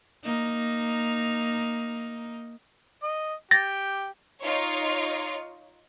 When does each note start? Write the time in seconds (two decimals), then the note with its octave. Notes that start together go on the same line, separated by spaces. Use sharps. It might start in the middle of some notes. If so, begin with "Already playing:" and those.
0.25 A#3 D#4
3.02 D#5
3.51 G4 A6 A#6
4.40 D#4 F4 C#5